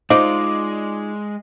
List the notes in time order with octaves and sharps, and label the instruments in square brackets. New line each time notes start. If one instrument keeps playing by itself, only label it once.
[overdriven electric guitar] G#3 [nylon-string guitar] D#4 F4 [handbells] C5 D#5 F5 [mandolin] D5